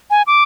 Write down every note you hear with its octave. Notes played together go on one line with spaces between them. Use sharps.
G#5
D6